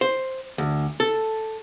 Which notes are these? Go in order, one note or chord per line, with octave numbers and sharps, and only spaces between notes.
C5
D2
A4